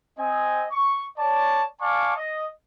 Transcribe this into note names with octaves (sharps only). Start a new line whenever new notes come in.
C4 D#5 G#5
C#6
C#5 D5 A5
D5 F5 G#5 A5 C#6 D6
D#5